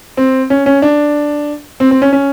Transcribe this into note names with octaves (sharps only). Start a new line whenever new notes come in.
C4
C#4
C#4
D4
C4
C4
C#4
C#4